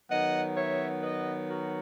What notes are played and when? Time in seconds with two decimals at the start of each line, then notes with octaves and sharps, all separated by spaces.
0.10 D#3 F#3 B3 D#5 F#5
0.56 C#5 E5
1.03 B4 D#5
1.49 F#4 A#4